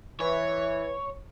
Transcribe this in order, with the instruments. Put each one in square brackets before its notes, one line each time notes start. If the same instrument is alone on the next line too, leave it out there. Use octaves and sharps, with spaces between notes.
[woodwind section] E3 [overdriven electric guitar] C#5